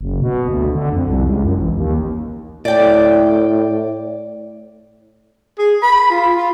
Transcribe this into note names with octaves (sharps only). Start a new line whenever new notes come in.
F#1
B2
D2
D3
F2
C2
C#2
F#2
A1
D#2
A2 D5 G5
G#4
B5
F4
F4